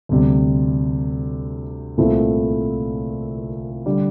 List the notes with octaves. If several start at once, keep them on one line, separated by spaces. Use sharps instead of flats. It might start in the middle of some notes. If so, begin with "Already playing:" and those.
D2 C3 G3
C2 A#2 A3 C4 E4
D3 G3